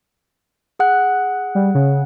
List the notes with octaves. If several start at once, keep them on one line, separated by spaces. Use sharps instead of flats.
G#4 F#5 F#6
G3
C#3